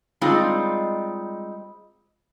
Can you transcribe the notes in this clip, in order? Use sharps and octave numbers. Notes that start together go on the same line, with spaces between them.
G3 G#3 C4 D#4 F4